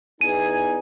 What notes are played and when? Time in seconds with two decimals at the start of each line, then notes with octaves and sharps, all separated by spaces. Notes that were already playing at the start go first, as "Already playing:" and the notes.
0.21 E2 D#4 G#5 D#7